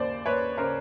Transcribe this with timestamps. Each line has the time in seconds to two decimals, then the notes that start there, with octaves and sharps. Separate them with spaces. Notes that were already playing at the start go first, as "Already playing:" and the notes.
Already playing: D#2 C#3 C5 D5
0.25 D#2 B4 C#5
0.57 C#3 A#4 C5